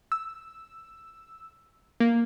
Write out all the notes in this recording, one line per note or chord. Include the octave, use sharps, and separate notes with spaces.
E6
A#3